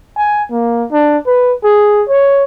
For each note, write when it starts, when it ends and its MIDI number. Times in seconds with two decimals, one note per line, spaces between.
0.17 0.44 80
0.51 0.85 58
0.92 1.18 62
1.27 1.54 71
1.64 2.03 68
2.09 2.44 73